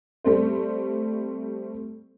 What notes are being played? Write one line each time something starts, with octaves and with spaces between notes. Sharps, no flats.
G3 A3 C4 C5